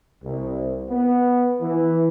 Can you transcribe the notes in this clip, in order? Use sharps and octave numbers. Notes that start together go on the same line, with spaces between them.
C2
B3
E3